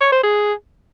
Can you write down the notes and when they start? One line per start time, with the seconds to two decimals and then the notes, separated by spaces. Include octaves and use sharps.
0.01 C#5
0.12 C5
0.23 G#4